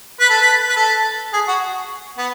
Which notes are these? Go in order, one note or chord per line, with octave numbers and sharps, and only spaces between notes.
B4
A4
B4
B4
A4
G#4
F#4
B3